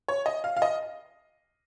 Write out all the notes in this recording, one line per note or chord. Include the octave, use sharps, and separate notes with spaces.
C#5
D#5
F5
F5
D#5